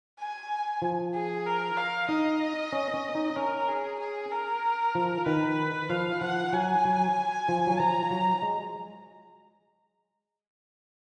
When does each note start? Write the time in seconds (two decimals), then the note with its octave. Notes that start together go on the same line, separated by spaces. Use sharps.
0.19 G#5
0.82 F3
1.14 G#4
1.46 A#4
1.77 F5
2.09 D#4 D#5
2.73 C#4
2.94 C#4
3.15 D#4
3.36 C#4 A#4
3.68 G#4
3.99 G#4
4.31 A#4
4.95 F3
5.26 D#3 B4
5.89 F3 F5
6.21 F3 F#5
6.53 F#3 G#5
6.85 F#3
7.49 F3
7.67 F#3
7.80 F3 A#5
8.11 F#3
8.42 G#3